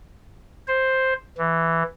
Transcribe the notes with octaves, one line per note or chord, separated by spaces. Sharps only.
C5
E3